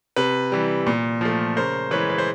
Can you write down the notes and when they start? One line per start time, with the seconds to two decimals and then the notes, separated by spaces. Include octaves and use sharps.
0.16 C3 B4
0.52 E3 G3
0.86 A#2
1.21 F3 A3
1.56 C#3 A#4 C5
1.91 E3 G#3 B4 C#5
2.10 B4
2.18 C5